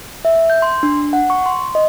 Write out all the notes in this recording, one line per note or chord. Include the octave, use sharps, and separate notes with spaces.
E5
G6
C6
D4
F#5
C#6
C6
D#5